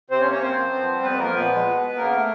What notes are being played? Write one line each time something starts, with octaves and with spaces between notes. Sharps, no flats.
C3 C4 C5
C#4 C#5
A#3
C#4 C#5
F#2 C4 C5
F3
B3
G3
F2 B3 B4
F3 A#3 A#4
A#2 B3 B4
G#3
B2
B3
C#3 A#3 A#4
A3